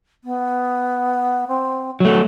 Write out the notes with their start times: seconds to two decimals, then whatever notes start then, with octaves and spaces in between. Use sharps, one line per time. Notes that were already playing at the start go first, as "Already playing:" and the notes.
0.24 B3
1.48 C4
2.00 F#3 A3 F#4